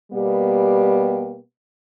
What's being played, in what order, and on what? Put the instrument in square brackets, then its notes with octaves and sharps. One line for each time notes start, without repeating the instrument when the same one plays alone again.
[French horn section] B2 G3 A#3 B3 G4